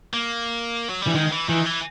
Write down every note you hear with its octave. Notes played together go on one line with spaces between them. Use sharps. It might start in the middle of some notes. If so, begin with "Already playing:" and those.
A#3
F#3
G3
E3
D#3 G#3
E3
D#3 E3
E3